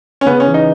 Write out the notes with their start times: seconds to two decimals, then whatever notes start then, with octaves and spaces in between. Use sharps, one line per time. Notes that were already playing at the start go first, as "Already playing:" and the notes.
0.21 C#4
0.25 C#3 B3
0.40 C#4
0.47 E3
0.54 D#4